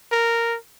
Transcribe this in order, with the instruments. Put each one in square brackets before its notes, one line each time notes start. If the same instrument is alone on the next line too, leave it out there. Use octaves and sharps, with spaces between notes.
[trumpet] A#4